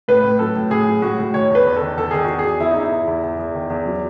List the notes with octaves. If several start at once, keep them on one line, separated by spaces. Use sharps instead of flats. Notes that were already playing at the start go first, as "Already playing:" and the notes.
A2 B4
A2
F#3 A4
A2
A2 G#4
F#3
A2 F#4
A2
D#3 C#5
E2
B4
E2
A4
D#3
E2 A4
D#3 G#4
E2 F#4
G#4
E2
E2 E4
D#4
E2 E4
E2
E2
E2
E2
D#3
E2
F#3